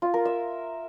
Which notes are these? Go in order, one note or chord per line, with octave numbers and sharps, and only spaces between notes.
F4
A#4
E5